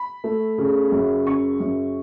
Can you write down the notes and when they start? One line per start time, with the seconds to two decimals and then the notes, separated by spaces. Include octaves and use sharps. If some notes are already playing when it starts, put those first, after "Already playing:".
Already playing: B5
0.24 A3
0.58 C#3
0.92 F#2
1.27 C#3 C#6
1.60 F#2